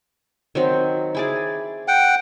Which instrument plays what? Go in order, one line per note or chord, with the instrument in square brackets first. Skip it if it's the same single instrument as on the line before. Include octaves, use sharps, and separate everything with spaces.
[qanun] D#3 F#3 C4
E4 G#4 D5
[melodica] F#5 G5